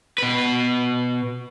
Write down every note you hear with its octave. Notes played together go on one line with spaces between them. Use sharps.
B2 B4